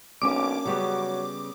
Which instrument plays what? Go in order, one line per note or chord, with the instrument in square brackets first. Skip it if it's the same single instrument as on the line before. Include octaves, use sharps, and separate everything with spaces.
[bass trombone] B1 [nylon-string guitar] A#3 C#4 D4 [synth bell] D6
[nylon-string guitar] C#3 G3 B3 [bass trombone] F#3